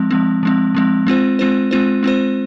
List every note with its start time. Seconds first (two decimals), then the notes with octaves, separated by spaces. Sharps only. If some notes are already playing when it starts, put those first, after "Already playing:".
Already playing: F3 G#3 C4
0.11 F3 G#3 C4
0.43 F3 G#3 C4
0.75 F3 G#3 C4
1.07 G#3 C4 F4 C5
1.39 G#3 C4 F4 C5
1.71 G#3 C4 F4 C5
2.03 G#3 C4 F4 C5